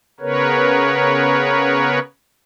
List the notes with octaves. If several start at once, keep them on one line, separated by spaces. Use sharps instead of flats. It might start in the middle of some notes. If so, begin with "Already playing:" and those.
C#3 B3 A#4 B4 C#5